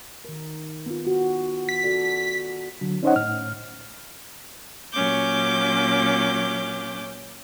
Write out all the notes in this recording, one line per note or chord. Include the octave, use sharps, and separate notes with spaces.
D#3 A#4
B3 F4
F#4
B6
F#4 A4 D5
D3 F#3
C#4 D#4 C5 C#5 D#5 F#5
A2 F6
A#2 F#3 C#4 D6 G6